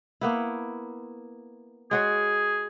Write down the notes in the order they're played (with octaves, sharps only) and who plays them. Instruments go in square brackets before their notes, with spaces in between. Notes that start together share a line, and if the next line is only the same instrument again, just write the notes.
[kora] A#3 B3 E4
[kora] G#3 F#4 C#5 [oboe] G#4